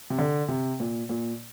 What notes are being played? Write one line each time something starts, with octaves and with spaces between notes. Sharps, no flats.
C3
D3
C3
A#2
A#2